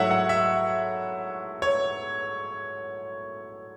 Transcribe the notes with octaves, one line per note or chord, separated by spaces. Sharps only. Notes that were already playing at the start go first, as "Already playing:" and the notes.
Already playing: G#2 F#3 A3 E4 C#5 E5 F#5
F#5
E5
C#5